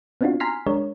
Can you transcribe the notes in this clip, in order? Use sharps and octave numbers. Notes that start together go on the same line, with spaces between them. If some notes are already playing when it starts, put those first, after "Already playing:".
B3 C4 D4 D#4 F4 F#4
G#5 A#5 C6 F6 B6 C7
G#3 D4 A#4 C#5